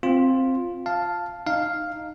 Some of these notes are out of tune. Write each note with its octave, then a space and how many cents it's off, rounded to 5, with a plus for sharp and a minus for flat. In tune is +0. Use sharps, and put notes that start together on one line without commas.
C4 +5 F4 +5
F5 +0 A5 +0
D#4 -15 F5 +0